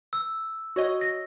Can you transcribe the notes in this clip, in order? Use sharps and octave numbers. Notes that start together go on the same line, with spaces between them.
E6
F#4 C#5 D#5
A#6